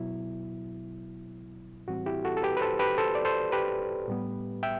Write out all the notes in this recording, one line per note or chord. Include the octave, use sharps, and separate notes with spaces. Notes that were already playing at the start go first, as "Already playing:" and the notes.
Already playing: B2 F#3 B3 E4
A2 E3 G3 C4 F#4
E4 G4
F#4 A4
A4
G4 B4
B4
A4 C5
G4 B4
A4 C5
D5
A4 C5
G4 B4
A2 G3 B3
E5 G5